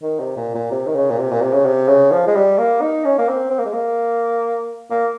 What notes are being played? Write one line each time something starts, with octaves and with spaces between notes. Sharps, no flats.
D#3
C3
A#2
A#2
C3
D#3
C#3
A#2
C3
A#2
C3
C#3
C3
C#3
F3
G#3
G3
A#3
D#4
C#4
A#3
C4
C4
A#3
G#3
A#3
A#3